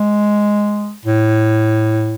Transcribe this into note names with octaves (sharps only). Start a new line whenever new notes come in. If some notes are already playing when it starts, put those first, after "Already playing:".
Already playing: G#3
A2